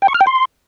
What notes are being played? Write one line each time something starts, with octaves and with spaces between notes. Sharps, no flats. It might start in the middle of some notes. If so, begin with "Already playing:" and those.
G5
C#6
F6
G5
C6